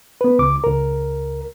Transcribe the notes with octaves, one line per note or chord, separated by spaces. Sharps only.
B3 B4
C#2 D6
C#2 A#4